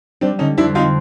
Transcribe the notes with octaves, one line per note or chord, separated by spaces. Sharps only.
G3 C4 D4
D3 C#4 D#4
F2 D4 E4
C4 D#4 F4